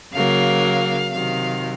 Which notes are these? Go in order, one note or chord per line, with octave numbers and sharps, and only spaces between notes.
C#3 F#3 A#3 F5
C3 D#3 F#3 F5